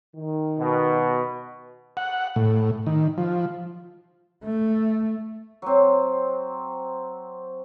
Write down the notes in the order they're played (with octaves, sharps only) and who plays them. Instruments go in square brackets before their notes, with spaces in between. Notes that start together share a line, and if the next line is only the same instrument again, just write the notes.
[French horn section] D#3
[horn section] B2
[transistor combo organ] F#5
A2
D#3
F3
[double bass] A3
[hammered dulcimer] F#3 C4